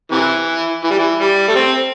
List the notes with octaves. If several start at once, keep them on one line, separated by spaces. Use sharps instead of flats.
C3 E3
E3
G3
E3
G3
A3
C4